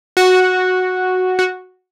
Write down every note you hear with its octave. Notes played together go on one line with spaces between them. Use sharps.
F#4
F#4